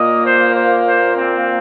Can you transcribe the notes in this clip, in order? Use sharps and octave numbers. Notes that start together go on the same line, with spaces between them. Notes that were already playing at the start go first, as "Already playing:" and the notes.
Already playing: A#2 A#3 D#5
C5
C5
C5
C4